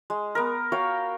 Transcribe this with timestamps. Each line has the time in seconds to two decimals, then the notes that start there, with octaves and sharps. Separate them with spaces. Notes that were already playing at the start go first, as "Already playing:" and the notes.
0.10 G#3
0.35 B3 A#4
0.72 F#4 C#5 F5 G5